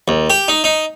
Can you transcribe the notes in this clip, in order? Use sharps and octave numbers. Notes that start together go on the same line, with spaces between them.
D#2
G4
D#4
D#4